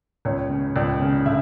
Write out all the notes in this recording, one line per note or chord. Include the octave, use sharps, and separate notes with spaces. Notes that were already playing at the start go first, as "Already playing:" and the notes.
C#2 C#5
C#3
C#2 D5
C#3
D3 E5